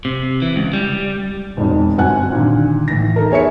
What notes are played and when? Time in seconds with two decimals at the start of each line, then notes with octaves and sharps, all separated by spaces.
0.05 C3
0.42 E3
0.56 C#2
0.73 G3
1.57 E1 B1 F2
1.98 G1 F#2 C4 F#5 G#5 F#6
2.32 A#2 D3 D#3
2.88 A2 E3 A#6
3.16 D#4 A4 A#4
3.31 B3 G#4 C#5 E5 C#7